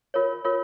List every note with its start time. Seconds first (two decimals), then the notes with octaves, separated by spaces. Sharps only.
0.14 F4 A#4 C#5
0.45 F4 A#4 C#5